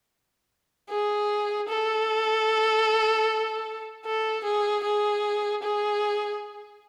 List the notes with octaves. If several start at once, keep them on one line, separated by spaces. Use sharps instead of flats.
G#4
A4
A4
G#4
G#4
G#4